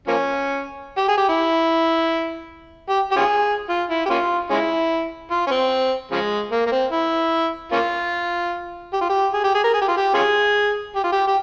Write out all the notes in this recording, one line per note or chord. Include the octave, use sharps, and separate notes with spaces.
F3 A#3 C#4
G4
G#4
G4
E4
G4
G4
C#4 F4 G#4
F4
E4
G4
A#3 C#4 F4
G#3 C#4 E4
F4
C#4
C4
C#3 F3 G#3
A#3
A#3
C4
E4
A#3 C#4 F4
G4
F4
G4
G#4
G4
G#4
A#4
G#4
G4
F4
G4
C#4 F4 G#4
G4
F4
G4
G4